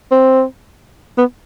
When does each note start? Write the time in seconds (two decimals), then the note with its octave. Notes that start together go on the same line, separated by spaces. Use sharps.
0.11 C4
1.18 B3